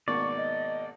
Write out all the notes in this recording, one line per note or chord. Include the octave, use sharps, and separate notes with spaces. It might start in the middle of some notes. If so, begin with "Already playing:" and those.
G#1 B2 A#3 D5 C#6
D#5